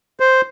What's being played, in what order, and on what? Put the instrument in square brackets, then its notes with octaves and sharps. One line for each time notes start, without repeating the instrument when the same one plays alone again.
[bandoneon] C5